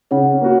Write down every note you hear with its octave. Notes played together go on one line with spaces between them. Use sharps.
C#3 C#5 F#5
A#3 F#4